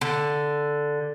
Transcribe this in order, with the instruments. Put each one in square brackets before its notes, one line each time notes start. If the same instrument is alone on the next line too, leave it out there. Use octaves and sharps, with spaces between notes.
[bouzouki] D3